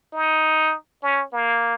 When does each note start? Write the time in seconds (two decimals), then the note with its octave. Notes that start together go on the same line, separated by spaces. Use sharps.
0.13 D#4
1.03 C#4
1.33 A#3